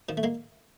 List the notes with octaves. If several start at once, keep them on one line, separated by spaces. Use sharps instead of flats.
D#3 F3
A3
G#3 A#3